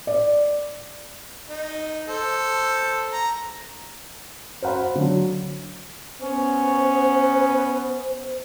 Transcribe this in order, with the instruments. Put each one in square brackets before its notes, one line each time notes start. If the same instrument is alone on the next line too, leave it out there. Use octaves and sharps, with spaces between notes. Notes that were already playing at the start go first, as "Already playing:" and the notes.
[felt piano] D5
[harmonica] D#4
A4 C5
A#5
[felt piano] C5 F5 F#5 B5 C6
D3 F#3
[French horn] B3 [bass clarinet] C#4 [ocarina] C5